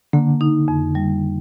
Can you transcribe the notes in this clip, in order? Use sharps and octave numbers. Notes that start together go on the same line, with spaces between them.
D3 A#3
D#4
F2
G3